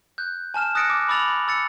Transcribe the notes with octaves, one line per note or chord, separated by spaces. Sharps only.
F#6 G6
G#5 A5 F6 E7
D#6 F#6 A6 A#6 C#7 D7
D6
B5 D6 E6 A6 F7 F#7
E6 A6 C#7